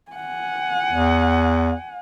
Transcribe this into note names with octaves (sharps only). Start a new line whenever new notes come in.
F#5 G#5
E2